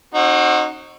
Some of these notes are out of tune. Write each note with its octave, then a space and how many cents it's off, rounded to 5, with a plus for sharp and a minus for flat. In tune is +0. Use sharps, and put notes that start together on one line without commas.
C4 +35 D#4 -15 F#4 +0